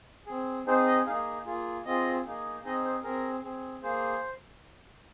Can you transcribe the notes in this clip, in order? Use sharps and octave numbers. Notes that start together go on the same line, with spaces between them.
C4 G#4
C4 D#4 G#4 C5
D#5
A#3 D#4 G#4 F5
A#3 F4 G#4
C4 F4 G#4 D#5
A#3 D#4 G#4
C4 D#4 G#4 D#5
C5
C4 G#4 A#4
C4 G#4
A#3 G#4 C5